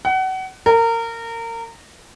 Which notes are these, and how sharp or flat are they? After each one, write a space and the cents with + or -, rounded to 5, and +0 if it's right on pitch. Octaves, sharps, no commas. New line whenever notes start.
F#5 +30
A#4 -25